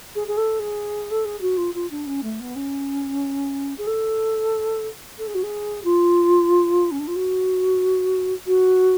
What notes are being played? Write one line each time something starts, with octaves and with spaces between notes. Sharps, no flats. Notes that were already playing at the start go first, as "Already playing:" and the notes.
G#4
G#4
A4
G#4
A4
G#4
F#4
F4
F4
D4
C#4
A3
B3
C#4
G#4
A4
A4
G#4
F#4
G#4
F4
C#4
D4
F4
F#4
F#4